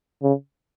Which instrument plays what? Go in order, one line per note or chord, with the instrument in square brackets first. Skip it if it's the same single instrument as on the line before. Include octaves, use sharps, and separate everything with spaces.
[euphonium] C#3